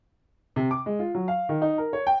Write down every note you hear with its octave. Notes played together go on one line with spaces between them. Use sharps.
C3
D6
G#3
F4
F#3
F5
D#3
D#4
A#4
C#5
G5